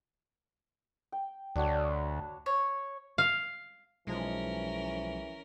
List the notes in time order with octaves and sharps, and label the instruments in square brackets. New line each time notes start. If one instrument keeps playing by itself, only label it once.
[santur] G5
[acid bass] D2 [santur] D4 F#4 C#5
[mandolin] C#5
[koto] F5
[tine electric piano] B1 F3 [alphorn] E3 [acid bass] G#3 [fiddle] C#4 A#4